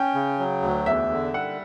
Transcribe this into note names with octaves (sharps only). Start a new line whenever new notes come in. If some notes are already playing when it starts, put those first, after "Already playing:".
Already playing: C#4 G5
C#3
F#3
D2
E2 E5
D3
G3 F#5